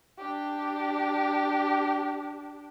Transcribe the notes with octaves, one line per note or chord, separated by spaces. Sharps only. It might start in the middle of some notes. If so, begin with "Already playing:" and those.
D4 G4